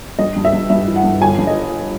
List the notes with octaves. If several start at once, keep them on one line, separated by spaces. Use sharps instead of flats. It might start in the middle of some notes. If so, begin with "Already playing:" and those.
G2 D#5
G2
E5
G2
G2 E5
E3
F#5
G2
G1 G#5
G2
D#5